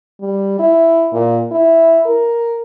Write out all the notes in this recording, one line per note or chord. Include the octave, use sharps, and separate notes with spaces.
G3
E4
A#2
E4
A#4